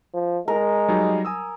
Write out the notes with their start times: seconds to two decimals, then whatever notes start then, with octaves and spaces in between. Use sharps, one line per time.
0.14 F3
0.48 G#3 A#4
0.88 F#3 G3 D#4
1.25 G#5 D#6 E6